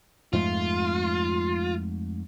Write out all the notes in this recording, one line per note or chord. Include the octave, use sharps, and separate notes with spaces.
F2 G#2 A3 F4